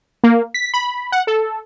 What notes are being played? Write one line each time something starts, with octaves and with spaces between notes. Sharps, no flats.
A#3
B6
B5
F#5
A4